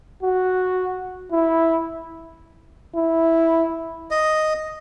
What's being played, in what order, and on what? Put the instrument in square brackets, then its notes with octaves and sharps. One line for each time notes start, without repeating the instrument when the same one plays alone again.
[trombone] F#4
E4
E4
[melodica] D#5